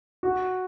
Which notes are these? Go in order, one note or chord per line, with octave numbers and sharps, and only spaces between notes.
F#4